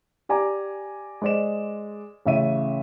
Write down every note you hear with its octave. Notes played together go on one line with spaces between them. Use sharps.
G4 D5 G#5 A#5 D6
G#3 C5 D5 D#5 E7
A1 C#3 E5 D#7